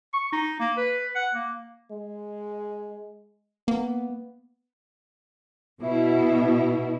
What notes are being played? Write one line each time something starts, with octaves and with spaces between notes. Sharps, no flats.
C#6
D#4
A#3
B4
F#5
A#3
G#3
A#3 B3
B2 E4